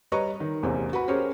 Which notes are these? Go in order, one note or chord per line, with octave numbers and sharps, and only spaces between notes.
G3 B4 C#5 D#5 A#5 C#6
D#3
A1 E2 C3 A#3 C4
F#4 B4 B5
C#4 G4 G#4 A#4 C5 C#5